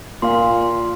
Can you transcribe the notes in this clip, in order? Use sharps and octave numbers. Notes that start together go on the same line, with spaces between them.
A#2 F5 C6